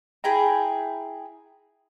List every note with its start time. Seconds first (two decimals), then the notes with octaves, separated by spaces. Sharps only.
0.24 E4 G#4 G5 A#5